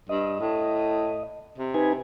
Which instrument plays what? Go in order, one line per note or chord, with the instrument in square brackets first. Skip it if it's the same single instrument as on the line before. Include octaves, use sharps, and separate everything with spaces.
[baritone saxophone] G2 [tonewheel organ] D#5
[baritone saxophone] A2
C3
[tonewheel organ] D#4 B4 G#5